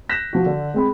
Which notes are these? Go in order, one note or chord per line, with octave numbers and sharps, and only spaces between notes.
F#6 G6 A#6 B6 E7
F3 F#4
D3
G#3 C4 B5